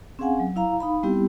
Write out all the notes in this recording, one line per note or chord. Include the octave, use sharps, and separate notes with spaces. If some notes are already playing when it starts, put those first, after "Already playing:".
C4 C#4 G#4 F5 F#5 G#5
F#3
E4 F5 A#5
D#4 F5 B5
G3 B3 C4 E4 G4